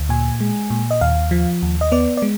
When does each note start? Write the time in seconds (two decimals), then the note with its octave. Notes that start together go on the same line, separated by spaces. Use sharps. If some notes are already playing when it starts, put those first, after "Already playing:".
Already playing: D2
0.09 A#2 G#5
0.41 G#3
0.70 A#2
0.91 D#5
1.01 D#2 F5
1.31 F3
1.62 D#2
1.81 D#5
1.92 B3 D5
2.17 D5
2.22 G#3